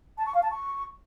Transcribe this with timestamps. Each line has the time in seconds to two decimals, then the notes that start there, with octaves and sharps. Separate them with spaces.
0.18 A5
0.26 C#6
0.34 F5
0.43 A5
0.51 C#6